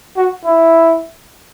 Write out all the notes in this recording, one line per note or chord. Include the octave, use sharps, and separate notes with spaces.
F#4
E4